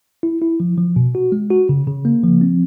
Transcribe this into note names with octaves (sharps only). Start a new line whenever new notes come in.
E4
E4
F3
F3
B2
F#4
G#3
F#4
C#3
C#3
A#3
F3
C4